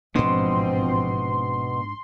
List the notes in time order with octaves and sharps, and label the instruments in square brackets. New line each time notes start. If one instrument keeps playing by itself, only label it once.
[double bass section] A1 F3 C4 [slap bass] G#2 D4 [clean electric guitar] B2 [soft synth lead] C6